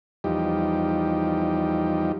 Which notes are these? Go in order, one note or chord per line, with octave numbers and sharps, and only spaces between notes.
E2 F3 G3 D#4 G4